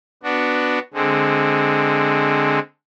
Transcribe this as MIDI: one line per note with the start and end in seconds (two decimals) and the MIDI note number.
0.23 0.79 59
0.23 0.79 62
0.23 0.79 66
0.94 2.59 50
0.94 2.59 56
0.94 2.59 60